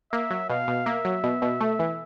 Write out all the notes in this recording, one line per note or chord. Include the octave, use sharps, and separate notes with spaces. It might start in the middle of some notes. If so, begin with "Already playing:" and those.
A#3 E5
F#3
B2 F5
B2
A#3 E5
F#3
B2
B2
A3
E3